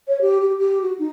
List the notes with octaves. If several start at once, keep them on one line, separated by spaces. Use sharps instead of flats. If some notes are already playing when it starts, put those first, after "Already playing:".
C#5
G4
G4
G4
F#4
D#4